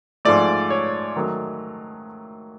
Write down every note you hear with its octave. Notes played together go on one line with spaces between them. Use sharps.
G#2 F3 A3 D5
C#5
D#3 F#3 A3